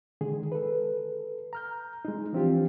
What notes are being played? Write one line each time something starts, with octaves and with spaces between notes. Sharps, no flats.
D3 D#3 G#3 G#4
A4 B4
A#5 F6 G6
G#3 D#4
E3 F3 C4 D4 F4 G4